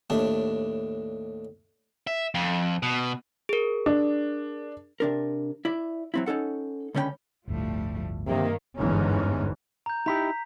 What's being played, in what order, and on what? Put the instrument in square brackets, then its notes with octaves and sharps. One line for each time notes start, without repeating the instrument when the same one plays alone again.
[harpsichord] D#2 A2 D4
[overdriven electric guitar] E5
F2
B2
[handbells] G#4 A#4
[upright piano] D4
[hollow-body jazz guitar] C3 D4 A#4
E4 D5
F#3 C4 E4
C#4 D#4 A4 F#5
C#2 D3 C#4 D4 G5 B5
[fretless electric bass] G1 D2 A2 [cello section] F3 G3 A3
[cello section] G2 [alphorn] C3 [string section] D#3 A#3
[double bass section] G1 E2 G#2 E3 C#4
[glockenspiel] A#5 G6
[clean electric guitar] D#4 E4 G4 [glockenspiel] A#5 B6